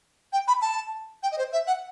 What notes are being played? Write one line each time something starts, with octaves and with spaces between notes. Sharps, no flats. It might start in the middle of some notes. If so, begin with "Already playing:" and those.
G5
B5
A5
G5
D#5
C5
E5
F#5